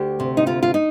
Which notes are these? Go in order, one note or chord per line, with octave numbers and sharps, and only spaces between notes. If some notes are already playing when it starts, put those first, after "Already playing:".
Already playing: D2 G4
C3
D#4
D2 F4
F4
D#4